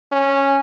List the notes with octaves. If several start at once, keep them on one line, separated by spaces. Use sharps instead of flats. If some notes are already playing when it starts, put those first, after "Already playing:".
C#4